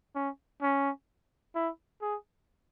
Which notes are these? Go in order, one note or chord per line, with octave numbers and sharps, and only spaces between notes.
C#4
C#4
E4
G#4